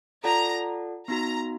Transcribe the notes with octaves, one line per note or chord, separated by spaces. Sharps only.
F4 A4 D5 F#5 A5 A#5
B3 D#4 F#4 A#5